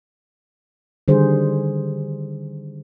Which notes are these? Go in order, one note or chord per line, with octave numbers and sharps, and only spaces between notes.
D3 D#3 G3 G#4 C5